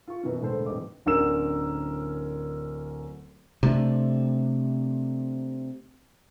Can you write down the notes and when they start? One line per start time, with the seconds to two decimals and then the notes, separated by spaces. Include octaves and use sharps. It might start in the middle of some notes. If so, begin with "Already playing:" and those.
0.07 F4 C#6
0.23 F#2 B2 E3 B3 C#4
0.42 E1 A2 D3 A4 C5
0.66 D#1 E2 G2 C4 D#5 D6
1.06 D1 D3 C#4 A#4 E6 E7
3.63 C3 A3 D4